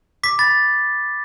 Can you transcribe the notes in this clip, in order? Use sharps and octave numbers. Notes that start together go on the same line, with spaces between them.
D6 B6
B5 A6